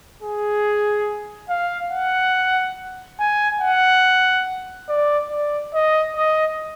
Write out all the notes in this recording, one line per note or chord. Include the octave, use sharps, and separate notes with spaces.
G#4
F5
F#5
G#5
F#5
D5
D5
D#5
D#5